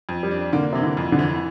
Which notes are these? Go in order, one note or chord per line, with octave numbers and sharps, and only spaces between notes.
F2
G3
D4
D3 A#3
C3 E3
D3
F2
D3
E3